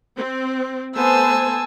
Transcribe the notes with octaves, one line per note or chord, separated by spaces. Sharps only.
C4
A3 B3 C5 G#5 A5 E6